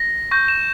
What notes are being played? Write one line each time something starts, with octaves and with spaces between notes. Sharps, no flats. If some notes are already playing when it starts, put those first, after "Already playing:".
Already playing: A#6
C#6 G6 A#6
E7